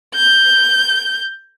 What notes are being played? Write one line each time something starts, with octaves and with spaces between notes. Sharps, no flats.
G6